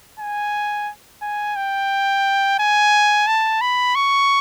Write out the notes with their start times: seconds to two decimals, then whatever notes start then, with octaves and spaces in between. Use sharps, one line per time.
0.19 G#5
1.22 G#5
1.56 G5
2.59 G#5
3.27 A5
3.61 B5
3.95 C#6